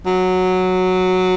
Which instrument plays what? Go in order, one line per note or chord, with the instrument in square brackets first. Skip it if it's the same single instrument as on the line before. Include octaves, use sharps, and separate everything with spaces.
[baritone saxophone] F#3